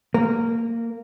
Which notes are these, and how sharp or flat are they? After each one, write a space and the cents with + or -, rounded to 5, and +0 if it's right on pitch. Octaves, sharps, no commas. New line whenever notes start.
A#3 -15